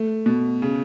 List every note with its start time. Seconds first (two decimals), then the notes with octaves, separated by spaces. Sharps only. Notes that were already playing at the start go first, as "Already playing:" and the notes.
Already playing: A3
0.26 B2
0.62 C#3